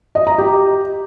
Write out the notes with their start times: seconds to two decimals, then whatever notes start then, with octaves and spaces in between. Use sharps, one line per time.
0.15 D#5
0.27 A#5
0.38 G4